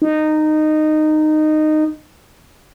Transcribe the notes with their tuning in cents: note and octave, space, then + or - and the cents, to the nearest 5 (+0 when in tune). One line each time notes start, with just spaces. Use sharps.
D#4 -15